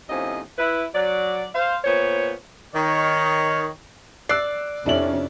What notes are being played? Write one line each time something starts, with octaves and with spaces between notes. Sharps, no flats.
D#2 A2 F3 C4 C#4 D#5
E4 B4
F#3 D5
C5 F5
A#2 B3 C5 C#5
D#3 C#5
D5 E6 F#6 C7
F2 C3 C#4 D4 E4 F#7